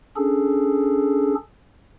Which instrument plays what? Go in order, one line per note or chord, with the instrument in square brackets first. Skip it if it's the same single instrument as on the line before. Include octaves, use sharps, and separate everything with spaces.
[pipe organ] C#4 D4 G#4 A4